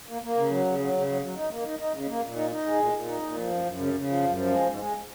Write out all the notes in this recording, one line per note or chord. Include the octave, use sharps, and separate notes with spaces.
A#3
A#3
C#3
F#3
C#3
F#3
C#3
F#3
F#3
D#4
A#3
D#4
D#4
C#3
A#3
A#2
D#4
D#4
G#3
A#2
A#2
D#4
A#2
F3
F#2
F#2
C#3
C#3
F3
F#2
F3
G#3
G#2
G#3